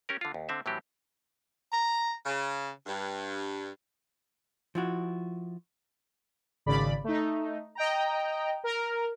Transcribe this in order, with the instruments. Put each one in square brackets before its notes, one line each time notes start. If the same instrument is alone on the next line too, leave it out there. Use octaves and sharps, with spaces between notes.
[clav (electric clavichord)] C#4 G4 A#4
D3 F4
D#2
D3 C4 E5
A2 E3 F#3 C4 G4
[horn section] A#5
C#3
G2
[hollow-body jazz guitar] F3 E4 F#4
[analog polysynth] G#1 C#3 D5 B5
A3 D#4
D#5 G5 A#5
A#4